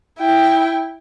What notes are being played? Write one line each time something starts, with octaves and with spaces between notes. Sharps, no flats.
E4 G5